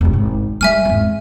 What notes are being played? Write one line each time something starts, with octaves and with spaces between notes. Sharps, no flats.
E1 C3
G#1
G3 A#3 E5 G#5 F6
G#1 E2